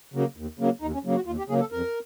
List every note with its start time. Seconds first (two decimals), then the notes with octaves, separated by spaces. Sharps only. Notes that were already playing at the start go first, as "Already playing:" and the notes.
0.14 C#3 F#3 A#3
0.36 D#2
0.59 C#3 F#3 A#3
0.82 D#2 D#4
0.93 C#4
1.04 C#3 F#3 A#3
1.15 F#4
1.26 D#2 F4
1.38 G4
1.49 C#3 F#3 A#3 G#4
1.60 A4
1.72 F2 A#4